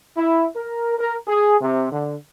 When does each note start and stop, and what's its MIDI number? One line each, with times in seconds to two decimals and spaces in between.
0.17 0.47 64
0.56 0.96 70
0.98 1.16 70
1.27 1.57 68
1.61 1.90 48
1.92 2.16 50